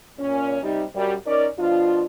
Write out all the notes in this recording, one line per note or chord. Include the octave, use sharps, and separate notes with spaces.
A#2 C#4
C3 G3 D#4
F#2 G3
C#4 D#4 A#4 D5
B2 F3 D4 F4